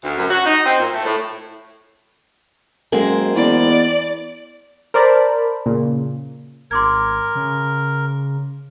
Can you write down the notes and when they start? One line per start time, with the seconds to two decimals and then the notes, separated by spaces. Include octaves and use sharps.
0.03 D2
0.17 F#2
0.30 F#4
0.46 D#4
0.65 C4
0.80 A#2
0.93 A3
1.05 A2
2.92 F#2 G#3 A#3 C4
3.36 E2 D5
4.94 A#4 C5 D5 A5 B5
5.66 A#2 C#3
6.71 G#1 A#4 C6 D6 G#6
7.35 C#3